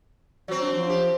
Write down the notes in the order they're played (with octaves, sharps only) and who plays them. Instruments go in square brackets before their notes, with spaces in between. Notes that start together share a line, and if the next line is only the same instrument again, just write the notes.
[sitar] F#3 C4 [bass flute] F#4
[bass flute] D4
F3
[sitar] G4